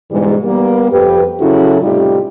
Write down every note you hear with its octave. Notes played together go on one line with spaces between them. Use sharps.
G#2 B2 D3 E3 G3 G#3
G3 A#3 B3
F2 G4 B4
C#3 F#3 C#4 E4 F#4 A4
A2 C3 G3 D#4 F4 G4